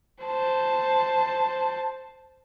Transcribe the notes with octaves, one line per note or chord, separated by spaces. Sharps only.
C5 A5